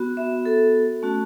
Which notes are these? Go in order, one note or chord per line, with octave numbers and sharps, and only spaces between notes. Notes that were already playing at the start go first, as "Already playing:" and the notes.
Already playing: B3 F#4
E5
A4
A3 C#4 F#4